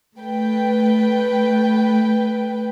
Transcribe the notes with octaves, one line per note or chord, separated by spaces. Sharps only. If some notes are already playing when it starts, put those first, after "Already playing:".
A3 B4 G5